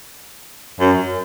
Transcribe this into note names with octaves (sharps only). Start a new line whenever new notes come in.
F#2